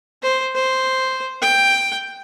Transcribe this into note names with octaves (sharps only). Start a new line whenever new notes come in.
C5
C5
G5